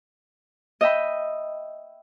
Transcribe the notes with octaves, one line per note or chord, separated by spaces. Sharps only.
D#5 E5 G5 B5